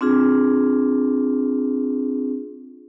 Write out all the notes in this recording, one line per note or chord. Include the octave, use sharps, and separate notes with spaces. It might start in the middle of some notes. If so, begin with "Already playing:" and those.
C4 D4 F4 G#4